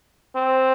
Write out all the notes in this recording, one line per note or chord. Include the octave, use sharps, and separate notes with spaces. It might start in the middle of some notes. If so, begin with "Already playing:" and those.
C4